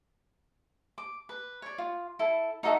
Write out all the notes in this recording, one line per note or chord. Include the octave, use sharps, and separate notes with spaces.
D6
B4
C#5 D5
F4
E4 A4
D#4 F#4 A4 E5